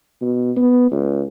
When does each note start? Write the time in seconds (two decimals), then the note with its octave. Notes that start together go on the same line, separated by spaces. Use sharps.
0.21 B2
0.57 B3
0.91 C#2